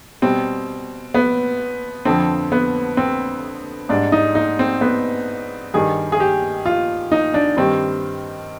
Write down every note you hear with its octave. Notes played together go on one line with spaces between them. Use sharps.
B2 G3 C4
B3
F2 D3 F3 C4
B3
C4
G#2 G3 D4
D#4
D#4
C4
B3
G2 D#3 G3 G#4
G#4
G4
F4
D#4
D4
G2 D#3 G3 C4